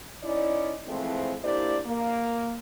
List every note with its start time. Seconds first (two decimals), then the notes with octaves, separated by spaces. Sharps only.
0.23 C#4 D#4 E4 D5
0.87 E3 F3 G#3 A3 C4
1.43 A#3 D4 E4 G4 C5 D5
1.86 A#3